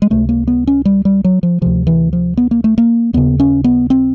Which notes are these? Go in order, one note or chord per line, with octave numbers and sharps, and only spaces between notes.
G#3
C#2 C3 A3
A#3
B3
C#4
G3
G3
F#3
F3
D2 C3 F3
E3
F3
B3
A#3
A3
A#3
D#2 C#3 B3
C#4
B3
C4